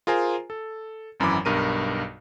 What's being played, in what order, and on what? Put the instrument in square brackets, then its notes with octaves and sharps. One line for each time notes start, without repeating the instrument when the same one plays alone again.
[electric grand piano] F4 G#4 A#4 C5 G#5 A#5
A4
G#1 F#2 E3 F#3 B5 D6
B1 G2 A#4 D#7